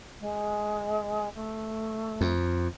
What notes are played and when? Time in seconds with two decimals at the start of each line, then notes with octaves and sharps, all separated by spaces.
0.20 G#3
1.34 A3
2.21 F2